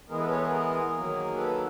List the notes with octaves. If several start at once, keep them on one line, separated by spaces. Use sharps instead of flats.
E3 G#3 B3 G#4 A#4
A4 B4
B4 C#5
G#4 A#4
G#4 A#4
D#3 F#3 A#3
A4 B4